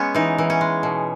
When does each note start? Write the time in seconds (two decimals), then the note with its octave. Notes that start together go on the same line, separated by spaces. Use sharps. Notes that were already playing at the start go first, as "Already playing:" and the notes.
Already playing: G#3 B3 C#4
0.15 E3 D#4
0.38 E3
0.50 C#4
0.61 G#3
0.83 B2